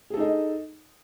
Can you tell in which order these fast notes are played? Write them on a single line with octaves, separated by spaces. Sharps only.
G#4 A4 D#4 D#5